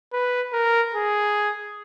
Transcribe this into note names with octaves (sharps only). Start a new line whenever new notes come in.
B4
A#4
G#4